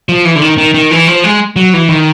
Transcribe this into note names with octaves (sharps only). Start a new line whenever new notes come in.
F3
E3
D3
D#3
D#3
D#3
E3
F3
G#3
F#3
E3
D#3